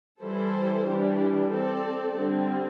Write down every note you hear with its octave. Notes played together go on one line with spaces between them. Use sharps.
E3 G3 E4 A4 C5
E3 G3 D4 G4
C4 A4 D5
D3 G3 C4